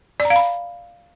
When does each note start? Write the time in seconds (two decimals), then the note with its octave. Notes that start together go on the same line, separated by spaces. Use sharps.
0.20 D5
0.25 A#5
0.30 F5
0.36 B5